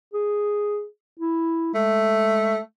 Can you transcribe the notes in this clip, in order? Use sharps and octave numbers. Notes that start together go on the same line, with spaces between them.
G#4
E4
G#3 A3